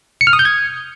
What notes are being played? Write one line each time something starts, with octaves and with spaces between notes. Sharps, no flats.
C#7
F6
D#6
G6
G#6